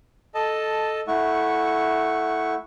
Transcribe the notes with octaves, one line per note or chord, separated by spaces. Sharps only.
A4 D#5 A5
A3 E4 F#5 C#6